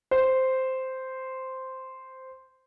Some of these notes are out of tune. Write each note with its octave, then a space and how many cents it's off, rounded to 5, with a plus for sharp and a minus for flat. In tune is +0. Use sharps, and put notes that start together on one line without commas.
C5 -5